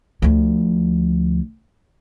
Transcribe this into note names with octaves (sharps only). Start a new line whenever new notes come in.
D2 F3